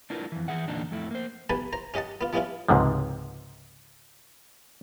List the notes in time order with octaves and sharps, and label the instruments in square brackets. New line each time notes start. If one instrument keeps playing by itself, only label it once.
[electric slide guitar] D4 E4 F4 A#4 B4
F2 E3
E3 G#4 E5 F#5
E2 A#2 D3 D4 D#4
F2 A3 E4
A#3 C5
[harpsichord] B1 G3 B4 G#5 A5
C5 A#5
C#4 G4 D#5 F#5 A5
B3 F4
F3 G3 B3 C#4 E4 F4
[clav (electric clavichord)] C#2 G#2 C3 F3